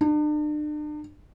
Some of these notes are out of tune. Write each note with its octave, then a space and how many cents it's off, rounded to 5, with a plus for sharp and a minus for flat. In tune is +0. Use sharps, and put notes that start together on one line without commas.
D4 +40